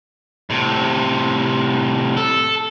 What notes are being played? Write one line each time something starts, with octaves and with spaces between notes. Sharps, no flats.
A2 C3
A4